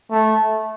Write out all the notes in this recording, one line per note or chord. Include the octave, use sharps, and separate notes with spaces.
A3